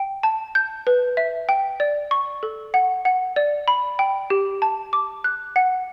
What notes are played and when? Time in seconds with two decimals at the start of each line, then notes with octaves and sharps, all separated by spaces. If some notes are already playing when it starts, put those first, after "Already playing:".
Already playing: G5
0.23 A5
0.55 G6
0.87 B4
1.17 E5
1.49 G5
1.80 D5
2.11 C#6
2.43 A4
2.74 F#5
3.05 F#5
3.36 D5
3.68 B5
3.99 G5
4.30 G4
4.62 A5
4.93 D6
5.24 F#6
5.56 F#5